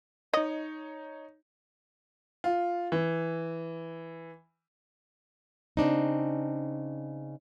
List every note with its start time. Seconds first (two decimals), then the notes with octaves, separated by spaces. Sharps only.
0.34 D#4 C#5 D#5
2.44 F4
2.92 E3
5.77 C#3 C4 D4 D#4